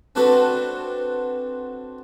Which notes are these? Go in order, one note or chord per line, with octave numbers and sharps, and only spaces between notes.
C4 D4 F#4 A4 B4